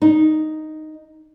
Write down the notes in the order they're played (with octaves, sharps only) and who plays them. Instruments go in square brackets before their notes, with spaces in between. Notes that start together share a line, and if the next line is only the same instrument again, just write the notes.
[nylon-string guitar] D#4